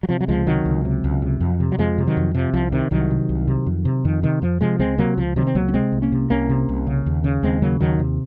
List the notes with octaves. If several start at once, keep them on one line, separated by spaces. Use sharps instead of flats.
F#3
C3 F3
F#3
C#2 F3 G#3
C3 D#3 F#3
C#2
C3
C#2
C3
F2
C3
F#3
F2 F3 G#3
C3
D#3 F#3
F2
C3 F3
C2 F3
C3 D#3
C2 D#3 F#3
C3
C2
C3
F2
C3
F2 D#3
C3 D#3
F2 F3
C3 F3 G#3
C#2 G#3 C4
C3 F#3 A#3
C#2 F3
C3 D#3 F#3
C4
C#2 F#3 A#3
C#4
C3 G#3 C4
C2
A#3 C#4
C3
C2 A#3 C#4
C3
C2
C#3
D#2
C#3
D#2 G#3 C4
C#3 F#3 A#3
D#2 D#3 F#3
C3